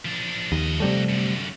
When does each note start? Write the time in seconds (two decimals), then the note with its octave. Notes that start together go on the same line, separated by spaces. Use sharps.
0.05 F3 D4
0.52 D#2 F3 D#5
0.80 C3 G3 A3
1.09 F#2 D3